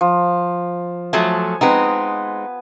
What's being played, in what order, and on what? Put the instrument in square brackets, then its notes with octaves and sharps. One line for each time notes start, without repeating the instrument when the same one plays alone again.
[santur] F3
[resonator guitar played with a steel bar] F3 F#3 A3 [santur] G#5 A5
[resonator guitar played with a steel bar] G#3 C4 D#4 [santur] B3 B4